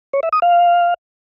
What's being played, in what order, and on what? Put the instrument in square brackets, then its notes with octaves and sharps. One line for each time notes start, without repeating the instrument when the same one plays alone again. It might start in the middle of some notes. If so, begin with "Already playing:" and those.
[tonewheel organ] C#5
E5
D#6
F5